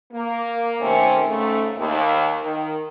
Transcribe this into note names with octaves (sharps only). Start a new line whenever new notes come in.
A#3
C3 D#3 A3 C4 C#4
G#2 C#3 A3
D#2
D#3